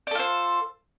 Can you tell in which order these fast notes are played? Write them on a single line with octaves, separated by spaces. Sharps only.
D5 A4 F4 C5